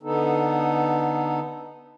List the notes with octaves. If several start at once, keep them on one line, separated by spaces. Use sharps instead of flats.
D3 B3 D#4 A4